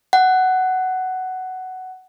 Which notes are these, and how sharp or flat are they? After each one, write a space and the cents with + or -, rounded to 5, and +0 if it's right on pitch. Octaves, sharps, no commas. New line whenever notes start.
F#5 +10